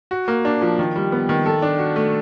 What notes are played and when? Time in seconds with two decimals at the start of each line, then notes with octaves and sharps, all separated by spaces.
0.11 F#4
0.28 A#3
0.45 D4
0.61 F3
0.79 D#3
0.96 G3
1.12 B3
1.29 D#3
1.46 A4
1.62 D4
1.79 F#4
1.96 A3